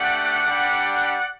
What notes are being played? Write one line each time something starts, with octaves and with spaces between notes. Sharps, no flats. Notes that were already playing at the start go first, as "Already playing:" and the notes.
Already playing: A3 D4 G4 D5 F#5
G3 D4 G4